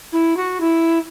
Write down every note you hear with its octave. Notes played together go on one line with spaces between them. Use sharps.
E4
F#4
E4